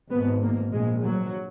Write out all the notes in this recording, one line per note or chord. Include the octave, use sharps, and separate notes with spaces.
G#1 G#2 B3
A#3
A#1 A#2 G#3
F#3